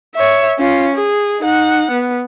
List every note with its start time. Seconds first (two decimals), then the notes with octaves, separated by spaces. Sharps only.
0.15 C#5 E5
0.59 C#4 F4
0.96 G#4
1.41 D#4 F#5
1.91 B3